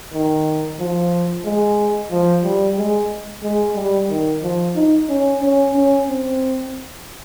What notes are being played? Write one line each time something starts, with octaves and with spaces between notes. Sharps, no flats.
D#3
F3
G#3
F3
G3
G#3
G#3
G3
D#3
F3
D#4
C#4
C#4
C#4
C4